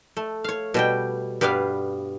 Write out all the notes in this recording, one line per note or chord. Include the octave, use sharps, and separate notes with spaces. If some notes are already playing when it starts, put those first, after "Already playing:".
A3
C#5 F5
B2 G3 G5
G2 G3 B3 B4 F5